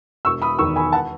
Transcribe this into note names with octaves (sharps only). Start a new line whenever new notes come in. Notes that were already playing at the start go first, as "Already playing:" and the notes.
E1 C#6 E6
B5 D#6
E2 D#3 C#6 E6
G#5 B5
F#5 A5